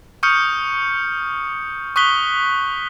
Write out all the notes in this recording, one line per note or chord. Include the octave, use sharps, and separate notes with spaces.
C#6 D#6 F6 G6 C#7
C#6 D#6 F#6 B6 G7